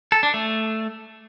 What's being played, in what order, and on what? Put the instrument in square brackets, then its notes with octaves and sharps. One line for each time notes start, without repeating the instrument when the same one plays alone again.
[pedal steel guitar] A4
D4
A3